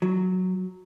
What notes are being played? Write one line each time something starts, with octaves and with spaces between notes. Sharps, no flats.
F#3